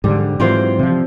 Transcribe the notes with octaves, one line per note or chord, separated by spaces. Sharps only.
G#2 D3 G3
G#2 E3 F#3 C4 F4 C5
C3 F3